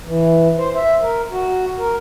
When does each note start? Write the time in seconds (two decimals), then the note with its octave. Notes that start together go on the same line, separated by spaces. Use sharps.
0.06 E3
0.58 C5
0.75 E5
1.01 A#4
1.31 F#4
1.78 A#4